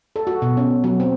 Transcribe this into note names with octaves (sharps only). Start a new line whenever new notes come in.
A4
F#4
B2
C#4
F#3
C4